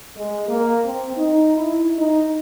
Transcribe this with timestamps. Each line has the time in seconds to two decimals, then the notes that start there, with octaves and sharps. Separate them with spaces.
0.17 G#3
0.49 A#3
0.85 C4
1.17 D#4
1.57 E4
1.99 D#4